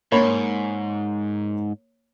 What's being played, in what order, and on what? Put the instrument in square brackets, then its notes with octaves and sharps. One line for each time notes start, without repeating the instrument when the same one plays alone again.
[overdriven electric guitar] G#2 [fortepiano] A#3 C#5 B5